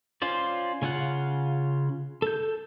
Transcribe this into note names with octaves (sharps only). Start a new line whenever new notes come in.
C#4 F4 C5 D5
C#3 C#4 F4 F#5 F#6
A4 G6